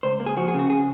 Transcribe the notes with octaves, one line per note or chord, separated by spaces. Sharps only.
C#2 C5
A#3
G#4
F3 F#4
G#4
C#3 F#4
G#4